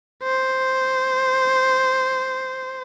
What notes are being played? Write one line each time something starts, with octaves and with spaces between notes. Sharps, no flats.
C5